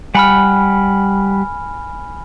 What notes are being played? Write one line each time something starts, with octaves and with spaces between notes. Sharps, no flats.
G3 F#5 G#5 B5 F6